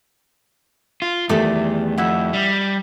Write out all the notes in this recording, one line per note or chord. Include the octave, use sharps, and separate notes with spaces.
F4
E2 D#3 G3 A3 A4 D6
F2 E4 E5 F#5
G3